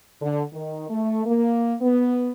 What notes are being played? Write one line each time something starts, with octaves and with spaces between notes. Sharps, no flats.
D3
D#3
A3
A#3
B3